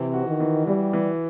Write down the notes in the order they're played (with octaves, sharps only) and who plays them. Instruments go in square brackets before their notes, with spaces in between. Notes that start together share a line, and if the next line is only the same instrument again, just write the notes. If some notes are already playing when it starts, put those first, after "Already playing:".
Already playing: [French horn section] C3 [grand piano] E3
[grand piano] F#4
[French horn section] D#3
[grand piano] E3
[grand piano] E3 [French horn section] G3
[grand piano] E3